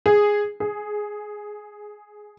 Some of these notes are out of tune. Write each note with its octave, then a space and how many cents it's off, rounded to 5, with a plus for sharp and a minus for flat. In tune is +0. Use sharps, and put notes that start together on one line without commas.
G#4 -5
G#4 +10